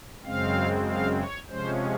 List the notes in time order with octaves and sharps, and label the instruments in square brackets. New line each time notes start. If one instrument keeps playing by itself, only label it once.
[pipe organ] F#2 C#3 G#3 C4 F5
F5
C#5
C3 F3 G#3 C#4 C5